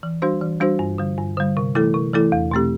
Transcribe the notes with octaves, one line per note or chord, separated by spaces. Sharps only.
E3
G3 D4 F#4 C5
E3
G3 D4 F#4 C5
G2
D3 G3
G2
D3 G3
C3
E3 A3 E4 A4
C3
E3 A3 E4 A4
E2
B2 A3 C4 G4